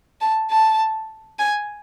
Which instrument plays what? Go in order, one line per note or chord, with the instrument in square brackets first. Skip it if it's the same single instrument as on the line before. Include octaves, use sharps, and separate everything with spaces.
[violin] A5
A5
G#5